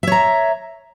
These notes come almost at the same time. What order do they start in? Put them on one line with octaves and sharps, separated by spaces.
E5 C#5 A#5